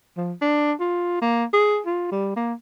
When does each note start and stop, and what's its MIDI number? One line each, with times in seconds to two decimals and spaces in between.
0.17 0.33 53
0.42 0.73 62
0.80 1.20 65
1.22 1.45 58
1.53 1.80 68
1.87 2.10 65
2.12 2.36 55
2.37 2.54 58